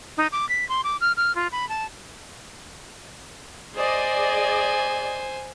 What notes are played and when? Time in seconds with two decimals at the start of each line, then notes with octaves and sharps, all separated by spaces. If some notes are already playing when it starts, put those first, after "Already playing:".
0.17 D#4
0.32 D6
0.49 B6
0.69 C6
0.84 D6
1.01 F6
1.17 F6
1.35 F4
1.52 B5
1.69 A5
3.77 G#4 C5 D5 D#5 G#5